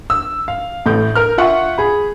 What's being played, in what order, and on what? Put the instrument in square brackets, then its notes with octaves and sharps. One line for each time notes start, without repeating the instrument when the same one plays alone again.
[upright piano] E6
F5
A1 A2 G6
A#4 F6
F4 E5 F#5 C#6
G#4 B5